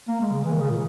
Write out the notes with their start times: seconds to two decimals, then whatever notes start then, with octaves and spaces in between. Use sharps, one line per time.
0.08 A#3
0.20 G#3
0.32 C#3
0.44 E3
0.52 D#3
0.61 C#3
0.70 A#2